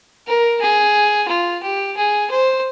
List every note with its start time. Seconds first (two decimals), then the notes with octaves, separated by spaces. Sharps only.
0.27 A#4
0.61 G#4
1.28 F4
1.63 G4
1.97 G#4
2.30 C5